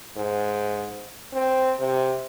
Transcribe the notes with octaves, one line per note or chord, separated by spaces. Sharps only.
G#2
C4
C3